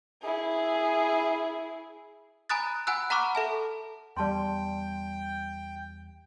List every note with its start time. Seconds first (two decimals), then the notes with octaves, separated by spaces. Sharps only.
0.22 E4 G#4
2.49 G#5 A#5 B5 D#6 F#6 A6
2.87 F#5 G#5 B5 E6 F#6
3.10 F#5 A#5 B5 C#6 D6 F6
3.35 A4 E5 A5
4.17 E2 G3 D5 G5 A5 C6